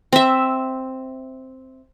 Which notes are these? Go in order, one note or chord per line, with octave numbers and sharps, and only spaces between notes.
C4 E5